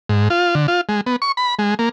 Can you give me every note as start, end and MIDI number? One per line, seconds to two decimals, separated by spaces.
0.09 0.28 44
0.30 0.55 65
0.55 0.67 50
0.68 0.81 65
0.89 1.01 56
1.06 1.16 59
1.22 1.32 85
1.37 1.55 83
1.59 1.74 56
1.79 1.89 58